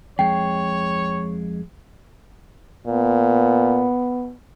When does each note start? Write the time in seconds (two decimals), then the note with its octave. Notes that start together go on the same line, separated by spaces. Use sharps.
0.19 F2 G#3 C#5 G5
2.87 A#2 B3